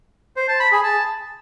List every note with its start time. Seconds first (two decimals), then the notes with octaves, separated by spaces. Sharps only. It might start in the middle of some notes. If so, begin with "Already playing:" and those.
0.36 C5
0.48 A5
0.60 B5
0.72 G#4
0.83 A5